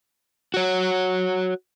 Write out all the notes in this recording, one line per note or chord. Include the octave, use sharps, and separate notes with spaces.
F#4 C#5